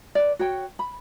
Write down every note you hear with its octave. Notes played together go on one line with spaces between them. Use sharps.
B4 D5
F#4 C#5 G5
B5